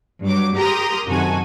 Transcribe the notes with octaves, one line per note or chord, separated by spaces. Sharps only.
G2 F#3 D6
G4 G#4 A#4 A#5 C6 D#6
F#2 C3 D#3 F#4 A4 G#5